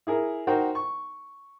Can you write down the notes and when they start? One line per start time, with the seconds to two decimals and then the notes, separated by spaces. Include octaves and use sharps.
0.07 E4 G#4 A#4
0.47 D#4 F#4 A#4 C5 G5
0.75 C#6